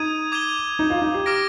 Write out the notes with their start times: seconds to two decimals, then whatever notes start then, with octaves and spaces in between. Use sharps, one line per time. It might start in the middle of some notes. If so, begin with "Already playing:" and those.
Already playing: D#4 D#6 G#6 D#7
0.32 D6 G#6 D#7 G7
0.79 D#4
0.90 F4
1.02 D#4
1.14 G4
1.26 D6 F6 A#6 D7